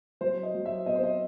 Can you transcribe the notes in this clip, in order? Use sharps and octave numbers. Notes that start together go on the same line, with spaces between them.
F#3 C5
D#5
F#3
E5
B3 D#5
C5
D#5